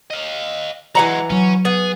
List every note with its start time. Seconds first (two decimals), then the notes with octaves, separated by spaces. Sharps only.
0.11 D#5 F5
0.95 E3 F#3 G#3 F#5 A#5
1.30 F#3 C#4
1.65 B3 G#4